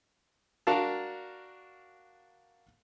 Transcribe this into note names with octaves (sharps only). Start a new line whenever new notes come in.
D4 F#4 A#4 F5 A5